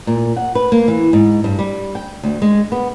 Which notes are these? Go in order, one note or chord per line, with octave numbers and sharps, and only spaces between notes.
A#2
F#5
B4
A#3
E3
G#2
G2
G3
G5
D2
G#3
B3